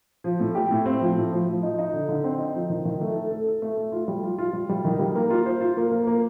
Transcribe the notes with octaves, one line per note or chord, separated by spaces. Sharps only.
F3
A2
G4
A2
C4
F3
A2
F3
F3
D#4
D#4
D3
D3
C4
D#4
F3
D#3
D#3
A3
A4
A4
A4
A3
A3
F4
G3
F4
F4
G3
G3
D#3
G3
A#3
F4
C5
F4
A#3
A#3
A#3